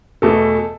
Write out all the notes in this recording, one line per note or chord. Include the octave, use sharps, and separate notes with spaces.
E2 B2 A3 A4